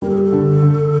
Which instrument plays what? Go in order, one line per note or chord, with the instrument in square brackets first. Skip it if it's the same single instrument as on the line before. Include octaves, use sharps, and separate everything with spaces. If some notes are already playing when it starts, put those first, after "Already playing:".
[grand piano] G3 [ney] A#4
[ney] A4
G4
A4
[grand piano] D3
D3